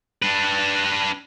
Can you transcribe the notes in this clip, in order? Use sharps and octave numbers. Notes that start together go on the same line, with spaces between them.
D4 B4